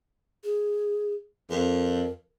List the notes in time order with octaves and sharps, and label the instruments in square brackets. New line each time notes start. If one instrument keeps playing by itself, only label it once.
[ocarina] G#4
[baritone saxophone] F2 [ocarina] A#4